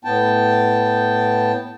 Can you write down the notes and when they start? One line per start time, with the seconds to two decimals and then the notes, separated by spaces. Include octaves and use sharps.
0.05 A2 B3 G5 A5